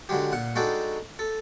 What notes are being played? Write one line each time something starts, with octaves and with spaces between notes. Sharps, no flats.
D3 F#3 G#3 G4
A#2 F#5
G#3 D4 D#4 F#4 A4 G5
A4